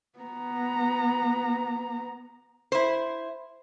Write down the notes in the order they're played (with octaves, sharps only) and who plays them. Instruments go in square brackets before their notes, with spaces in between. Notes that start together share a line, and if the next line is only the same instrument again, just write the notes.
[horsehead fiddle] B3 A#5
[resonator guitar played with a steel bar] E4 C5